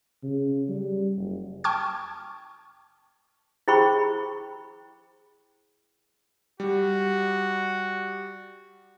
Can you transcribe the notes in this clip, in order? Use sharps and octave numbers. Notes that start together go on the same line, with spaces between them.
C#3
G3
F#1
G5 A5 C#6 D6 F6 G#6
E4 G#4 C5 G5 B5 C#6
G3 F#4